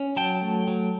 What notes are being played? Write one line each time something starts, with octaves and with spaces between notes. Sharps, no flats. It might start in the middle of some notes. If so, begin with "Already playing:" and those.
Already playing: C#4
F#3 G5 A5
A3
F#3